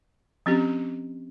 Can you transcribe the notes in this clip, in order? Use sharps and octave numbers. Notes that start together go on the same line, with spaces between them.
F3 C4 C#4 G4